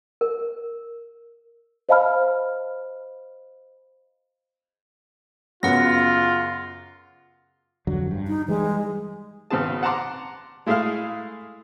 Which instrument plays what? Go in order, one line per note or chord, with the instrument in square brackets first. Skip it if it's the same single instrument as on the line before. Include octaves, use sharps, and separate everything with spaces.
[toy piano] A#4
[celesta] C5 D#5 F5 A5 B5 F6
[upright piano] F#2 C#3 B3 [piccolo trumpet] F4 [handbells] F#5 A#6
[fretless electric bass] F2 D3 F#3
G2
[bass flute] D#4
[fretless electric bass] E3 G3 [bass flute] G#3
[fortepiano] G#1 C#3 B3 C4 G#4 A5
F#5 A5 A#5 C6 D6
G#3 A3 E4 G#4 F5 F6